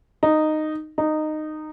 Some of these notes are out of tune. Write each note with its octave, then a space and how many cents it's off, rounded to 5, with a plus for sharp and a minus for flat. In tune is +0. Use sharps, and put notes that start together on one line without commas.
D#4 -10
D#4 -15